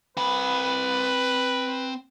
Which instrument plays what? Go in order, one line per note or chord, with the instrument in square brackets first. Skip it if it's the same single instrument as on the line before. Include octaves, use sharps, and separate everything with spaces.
[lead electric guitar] C4 B5 [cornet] B4